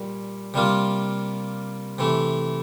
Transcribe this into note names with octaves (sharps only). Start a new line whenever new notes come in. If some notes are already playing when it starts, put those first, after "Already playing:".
Already playing: A#2 G3
C3 G3 A#3 F4
C3 E3 A3